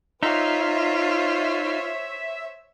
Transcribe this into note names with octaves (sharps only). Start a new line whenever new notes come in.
D#4 F4 C5 C#5 E5